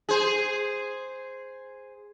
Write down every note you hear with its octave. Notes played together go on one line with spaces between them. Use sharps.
G#4 C5